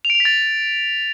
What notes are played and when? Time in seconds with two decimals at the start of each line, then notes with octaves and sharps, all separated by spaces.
0.05 F7
0.10 D7
0.15 F7
0.20 B6
0.25 A6